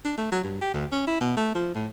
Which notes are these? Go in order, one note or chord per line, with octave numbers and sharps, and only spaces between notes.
D4
A3
F#3
G2
G4
D2
C#4
E4
B2
A3
F3
A2